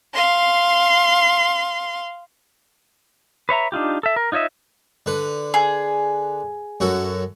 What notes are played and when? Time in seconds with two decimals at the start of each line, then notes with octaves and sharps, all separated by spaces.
0.14 F5 C6
3.49 B4 C#5 E5 A#5
3.72 D4 D#4 F4 G4
4.03 A4 E5
4.16 A#4
4.32 D#4 F4 C#5 D#5 E5
5.06 D3 B4
5.54 G#4
6.80 F#2 F#4 A4